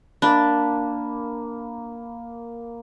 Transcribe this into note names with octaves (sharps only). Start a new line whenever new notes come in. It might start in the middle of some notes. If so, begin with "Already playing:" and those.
A#3 D4 B5